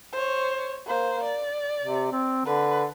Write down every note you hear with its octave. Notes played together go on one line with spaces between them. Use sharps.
C5 C#5
A#3 C5
D5
C3
C4
D3 B4